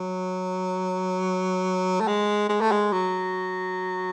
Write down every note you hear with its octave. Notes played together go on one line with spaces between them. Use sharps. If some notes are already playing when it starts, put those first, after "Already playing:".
Already playing: F#3
A3
G#3
G#3
A3
G#3
F#3